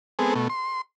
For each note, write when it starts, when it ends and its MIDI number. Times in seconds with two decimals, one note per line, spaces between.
0.19 0.34 56
0.19 0.34 59
0.19 0.34 60
0.19 0.34 68
0.19 0.34 69
0.35 0.48 47
0.35 0.48 57
0.49 0.81 84